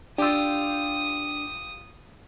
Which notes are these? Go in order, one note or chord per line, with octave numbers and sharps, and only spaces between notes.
D4 F4 G4 D#6 E6